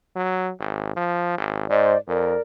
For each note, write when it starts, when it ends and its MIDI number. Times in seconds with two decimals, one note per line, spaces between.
0.16 0.51 54
0.60 0.94 32
0.96 1.35 53
1.38 1.65 32
1.70 1.94 44
1.70 1.96 72
1.70 1.96 74
1.70 1.96 75
2.08 2.35 41
2.08 2.41 70
2.08 2.41 74